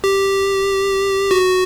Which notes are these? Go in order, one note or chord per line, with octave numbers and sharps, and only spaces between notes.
G4
F#4